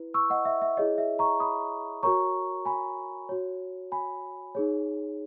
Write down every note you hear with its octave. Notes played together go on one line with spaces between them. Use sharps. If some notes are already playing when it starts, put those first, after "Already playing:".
Already playing: E4 B4
C#6 E6
D#5 F#5
E5
E5
E4 G#4 C#5 D#5
E5
A#5 C#6
B5 D#6
F#4 A#4 C#5 A#5 C#6
G#5 B5
F#4 C#5
G#5 B5
D#4 G#4 C#5